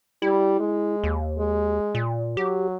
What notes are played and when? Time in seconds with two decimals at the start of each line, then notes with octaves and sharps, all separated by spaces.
0.22 G3 E4
0.59 G#3
1.04 D#2
1.39 G#3
1.95 A#2
2.37 F#3 G4